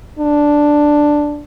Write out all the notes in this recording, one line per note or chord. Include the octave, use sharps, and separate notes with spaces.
D4